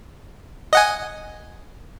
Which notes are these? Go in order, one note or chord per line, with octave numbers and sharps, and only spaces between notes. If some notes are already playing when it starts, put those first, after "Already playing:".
D#5 F#5 G#5